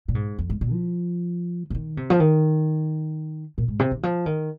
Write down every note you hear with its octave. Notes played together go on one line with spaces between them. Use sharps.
A#2
G#2
F2
G#2
A#2
F3
C3
D#3
C3
F3
D#3
A#2
G#2
C3
D#3
F3
D#3